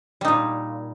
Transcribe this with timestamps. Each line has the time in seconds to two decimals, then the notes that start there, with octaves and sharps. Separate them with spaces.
0.21 G3
0.25 D#4
0.28 A#2